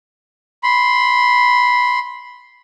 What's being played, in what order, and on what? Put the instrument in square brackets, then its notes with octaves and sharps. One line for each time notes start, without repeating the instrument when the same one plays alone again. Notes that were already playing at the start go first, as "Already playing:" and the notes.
[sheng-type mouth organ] B5 C6